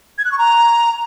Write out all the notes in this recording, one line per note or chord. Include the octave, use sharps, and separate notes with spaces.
G#6
F#6
C#6
A#5